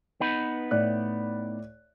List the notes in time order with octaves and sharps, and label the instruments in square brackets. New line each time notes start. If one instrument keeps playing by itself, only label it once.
[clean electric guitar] B3 D#4 B4
[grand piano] A2 D5 F#6